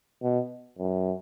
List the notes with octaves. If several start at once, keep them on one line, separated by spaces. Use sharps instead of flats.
B2
F#2